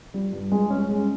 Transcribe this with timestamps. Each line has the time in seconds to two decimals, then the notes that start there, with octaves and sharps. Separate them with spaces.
0.14 G3
0.33 G2
0.52 G#3
0.70 C#4
0.89 G#3